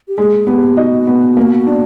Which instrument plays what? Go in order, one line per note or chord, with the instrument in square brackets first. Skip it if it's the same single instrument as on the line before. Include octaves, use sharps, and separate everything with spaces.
[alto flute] G4
[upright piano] G#3 [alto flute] G#4
[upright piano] B3 [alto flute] G4
[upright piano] D#4 [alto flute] F#4
[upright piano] B3
A#3
D4